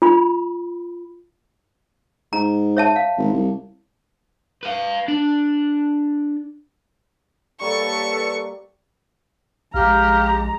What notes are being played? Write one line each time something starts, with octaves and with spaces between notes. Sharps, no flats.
F4 B5
G#2 A#5
C#5 E5 A5
F5
G#1
C2
B4 F5
D4
G3 A#3 A4 B4 C#5 D5 C#6
A#1 G#3 G4 F5 A#5